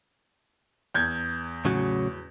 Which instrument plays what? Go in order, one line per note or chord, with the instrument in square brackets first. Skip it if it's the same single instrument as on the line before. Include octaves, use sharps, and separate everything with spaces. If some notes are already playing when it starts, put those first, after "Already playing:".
[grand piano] E2 G6 G#6
[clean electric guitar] A2 C#3 F#3